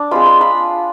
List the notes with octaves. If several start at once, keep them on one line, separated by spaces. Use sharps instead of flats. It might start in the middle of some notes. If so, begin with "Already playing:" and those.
Already playing: D4
G#3 C4 F4 B5
B5
F4 B5